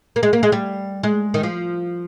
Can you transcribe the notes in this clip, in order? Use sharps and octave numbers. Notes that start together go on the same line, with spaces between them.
A#3
G#3
A#3
G#3
G3
G#3
D#3
F3